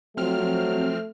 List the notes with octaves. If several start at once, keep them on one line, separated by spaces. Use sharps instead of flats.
F3 F#3 A3 C4 F6